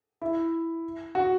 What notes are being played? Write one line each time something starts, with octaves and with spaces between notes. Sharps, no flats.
E4
F#4